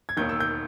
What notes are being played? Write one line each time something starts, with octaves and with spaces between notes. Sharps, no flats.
G#6
E1 D#2 D#3 G6
E6
G6